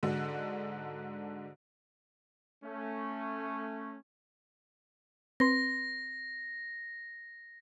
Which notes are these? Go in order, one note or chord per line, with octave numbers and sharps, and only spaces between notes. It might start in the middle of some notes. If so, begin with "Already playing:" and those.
G#2 D3 G#3 D4 F#4
A3 C#4
C4 B4 C6 A#6